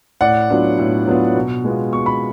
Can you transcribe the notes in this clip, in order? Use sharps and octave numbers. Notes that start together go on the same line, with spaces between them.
A2 D5 F#5
F#3 B3 D4 F4
A2
F#3 B3 D4 F4
B2
G#3 B3 F4
B2 C#6
B5